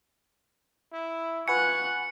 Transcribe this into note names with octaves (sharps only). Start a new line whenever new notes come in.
E4
F4 B4 F#5 G#5 C#6 F#6 C#7